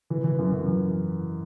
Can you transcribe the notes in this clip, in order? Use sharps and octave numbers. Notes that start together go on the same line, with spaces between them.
E3
E3
F#2
F#2
E3